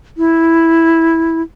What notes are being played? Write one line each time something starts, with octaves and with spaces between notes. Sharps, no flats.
E4